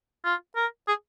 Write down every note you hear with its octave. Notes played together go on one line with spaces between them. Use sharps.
F4
A#4
G#4